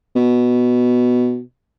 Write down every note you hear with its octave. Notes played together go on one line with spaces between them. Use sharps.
B2